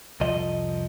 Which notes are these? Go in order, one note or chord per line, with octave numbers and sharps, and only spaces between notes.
C2 F2 F3 D#5